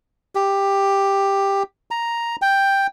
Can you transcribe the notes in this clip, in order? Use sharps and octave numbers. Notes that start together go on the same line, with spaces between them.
G4
A#5
G5